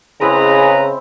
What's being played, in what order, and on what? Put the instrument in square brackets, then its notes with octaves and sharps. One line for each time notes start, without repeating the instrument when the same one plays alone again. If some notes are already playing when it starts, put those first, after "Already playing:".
[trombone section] C#3 [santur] G#3 C4 E4 [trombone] G#4 [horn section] B4 A#5